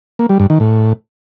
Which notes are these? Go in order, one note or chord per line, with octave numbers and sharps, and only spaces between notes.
A#3
G3
G2
D#3
A2